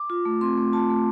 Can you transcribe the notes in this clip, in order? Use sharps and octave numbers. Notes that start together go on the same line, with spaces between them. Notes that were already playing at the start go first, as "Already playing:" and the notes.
Already playing: D6
F4
A3
C4 C6
A3
F4 A5
A3